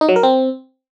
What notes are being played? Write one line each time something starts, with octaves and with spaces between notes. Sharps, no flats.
D#4
F#3
A#4
C4